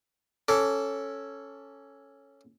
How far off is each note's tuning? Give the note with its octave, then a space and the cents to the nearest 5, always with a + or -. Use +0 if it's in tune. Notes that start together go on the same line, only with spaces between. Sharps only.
C#4 -5 A4 +0 D6 -25